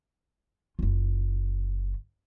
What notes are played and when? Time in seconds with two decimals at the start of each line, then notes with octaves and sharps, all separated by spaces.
0.79 F#1 F4